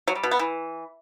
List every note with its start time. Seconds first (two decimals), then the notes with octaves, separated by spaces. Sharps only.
0.08 F#3
0.15 G3
0.23 B2
0.31 B3
0.39 E3